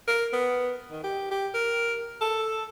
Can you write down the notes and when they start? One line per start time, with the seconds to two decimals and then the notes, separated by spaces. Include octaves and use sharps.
0.07 A#4
0.33 B3
0.91 D#3
1.04 G4
1.31 G4
1.54 A#4
2.21 A4